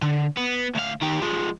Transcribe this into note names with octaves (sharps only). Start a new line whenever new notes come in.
D3
B3
D2 F5
D#3 G4
F3 G#3